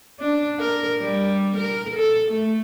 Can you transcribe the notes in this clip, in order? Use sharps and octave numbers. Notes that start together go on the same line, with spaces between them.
D4
A#4
G3
A#4
A4
A3